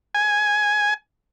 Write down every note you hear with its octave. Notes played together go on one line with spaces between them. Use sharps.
G#5